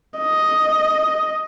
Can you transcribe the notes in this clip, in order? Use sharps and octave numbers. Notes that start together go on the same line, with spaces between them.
D#5